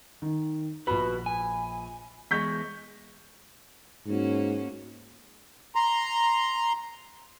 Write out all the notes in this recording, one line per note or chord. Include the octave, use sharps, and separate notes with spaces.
D#3
A#1 F#4 B4 B5
G#5
E2 G#3 C#6 G6 B6
G#2 A#3 C#4 F#4
A#5 C6